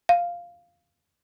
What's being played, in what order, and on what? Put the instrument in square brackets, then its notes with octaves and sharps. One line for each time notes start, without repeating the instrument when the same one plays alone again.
[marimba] F5